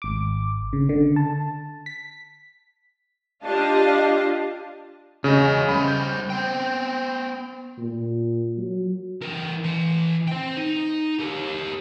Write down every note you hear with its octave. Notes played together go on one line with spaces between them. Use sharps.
G#1 D6
C#3
D3
A5
B6
D4 F4 G4 D#5 F5 A5
E2 C#3 G#4 D#5
G3 A#4 C5 B5
G6
B3 C5 G5
A#2
F#3
E3 A#4
E3 C6
C5 G5
D#4
G4 A#4